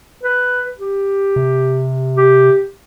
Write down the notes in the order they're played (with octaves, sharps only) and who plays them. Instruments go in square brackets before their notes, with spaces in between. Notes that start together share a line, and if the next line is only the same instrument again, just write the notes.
[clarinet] B4
G4
[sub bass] C3
[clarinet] G4